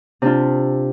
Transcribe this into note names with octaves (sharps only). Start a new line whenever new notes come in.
C3 D4 F4